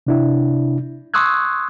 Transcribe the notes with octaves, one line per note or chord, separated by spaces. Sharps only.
C3 D4 E4
C6 C#6 D#6 E6 F#6 G#6